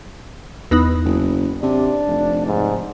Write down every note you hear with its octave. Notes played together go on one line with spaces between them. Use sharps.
E2 B3 D#4
F#1
C3 D4
F1
G#2